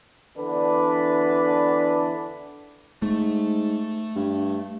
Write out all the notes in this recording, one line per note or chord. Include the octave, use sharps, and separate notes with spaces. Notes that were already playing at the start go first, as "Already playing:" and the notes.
D3 E3 B3 D4 B4
G#2 A3
G2